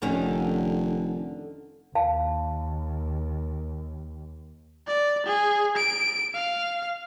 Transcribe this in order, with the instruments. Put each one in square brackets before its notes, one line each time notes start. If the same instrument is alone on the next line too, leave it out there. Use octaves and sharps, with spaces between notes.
[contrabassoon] F1 [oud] D3 D#3 C#4
[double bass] D#2 [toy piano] F5 A5
[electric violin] D5
G#4
D7
F5